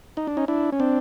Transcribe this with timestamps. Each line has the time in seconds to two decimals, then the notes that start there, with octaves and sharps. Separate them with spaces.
0.17 D#4
0.27 D4
0.37 C#4 D#4
0.48 D4 E4
0.72 C#4
0.80 C4 D4